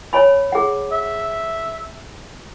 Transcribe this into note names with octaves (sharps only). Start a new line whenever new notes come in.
C#5 G#5 B5
G#4 F#5
E5